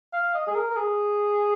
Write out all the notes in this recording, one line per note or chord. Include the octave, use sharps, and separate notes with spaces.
F5
D#5
G#4
A#4
A#4
G#4